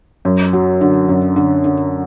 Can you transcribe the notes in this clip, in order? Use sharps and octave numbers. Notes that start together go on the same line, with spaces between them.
F#2
F#3
D3
F#2
D3
D3